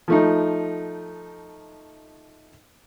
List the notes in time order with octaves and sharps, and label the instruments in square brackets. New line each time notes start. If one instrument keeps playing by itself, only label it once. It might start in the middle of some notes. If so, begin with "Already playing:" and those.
[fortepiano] F3 A3 D#4